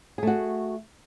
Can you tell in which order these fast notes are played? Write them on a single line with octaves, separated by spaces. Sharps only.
G#4 A3 F#4